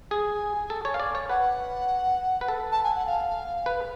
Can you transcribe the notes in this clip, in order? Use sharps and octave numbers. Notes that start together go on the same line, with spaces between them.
G#4 G#5
A4
C#5
F5
D5
C#5
B4 F#5
B4
A4
A5
G#5
F#5
F5
B4